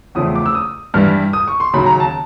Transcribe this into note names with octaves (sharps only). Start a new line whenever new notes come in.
E2 C#3 F3 A3 C4 D#6
D6
E6
D#6
G2 E3 G3 F6
D#6
C#6
C6
D#2 C#3 F#3 A#3 B5
A#5
A5